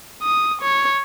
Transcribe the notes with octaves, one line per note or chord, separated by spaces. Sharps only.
D#6
C#5